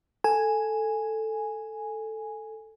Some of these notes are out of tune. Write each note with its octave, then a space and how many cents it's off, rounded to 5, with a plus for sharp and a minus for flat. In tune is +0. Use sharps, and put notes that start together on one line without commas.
A4 +5 G#5 +0